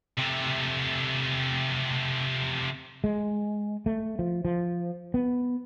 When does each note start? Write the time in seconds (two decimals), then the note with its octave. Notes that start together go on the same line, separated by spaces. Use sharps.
0.17 C3 A3
3.04 G#3
3.86 A3
4.19 F3
4.45 F3
5.14 B3